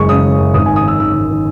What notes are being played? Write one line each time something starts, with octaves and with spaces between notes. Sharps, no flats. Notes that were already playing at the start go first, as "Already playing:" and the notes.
Already playing: F#1 F#2 G#3 C#6
C#3 D#6
C#3
F#2
G#1 D#6
D#3 G#5
D#6
D#3 E6
D#3 E6
G#1
D#3